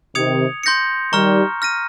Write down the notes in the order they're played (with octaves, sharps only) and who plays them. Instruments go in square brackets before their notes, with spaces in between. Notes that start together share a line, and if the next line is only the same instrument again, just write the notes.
[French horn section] C3 D#3 [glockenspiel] D#6 G#6 C#7 F7
[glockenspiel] C6 G6 A#6 C#7
[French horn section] D#3 G3 [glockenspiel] A#5 C#6 F6
[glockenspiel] F6 A#6 D#7